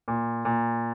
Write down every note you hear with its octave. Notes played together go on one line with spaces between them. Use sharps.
A#2
A#2